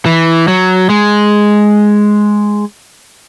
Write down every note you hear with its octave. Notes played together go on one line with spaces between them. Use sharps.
E3
F#3
G#3